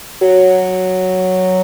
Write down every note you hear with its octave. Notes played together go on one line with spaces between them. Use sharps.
F#3